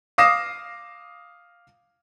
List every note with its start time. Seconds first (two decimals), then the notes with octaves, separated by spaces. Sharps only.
0.18 F5 D6 D#6 A#6 C7 E7